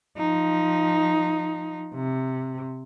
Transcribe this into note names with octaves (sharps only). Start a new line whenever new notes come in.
F3 D#4
C3